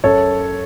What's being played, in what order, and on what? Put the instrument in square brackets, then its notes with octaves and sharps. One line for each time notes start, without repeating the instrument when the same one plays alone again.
[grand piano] F#2 A4 C#5